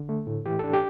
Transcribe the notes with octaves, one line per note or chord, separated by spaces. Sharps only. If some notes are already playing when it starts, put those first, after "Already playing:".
Already playing: D3
A3
A2
E3 G4
D4 A4
G4